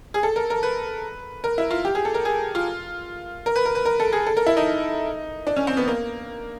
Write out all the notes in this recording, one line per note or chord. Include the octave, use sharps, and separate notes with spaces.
G#4
A4
A#4
A#4
B4
A#4
E4
F4
G4
G#4
A4
A#4
G#4
F4
A#4
B4
A#4
B4
A#4
A4
G#4
A4
A#4
E4
D#4
D4
C#4
C4
B3
A#3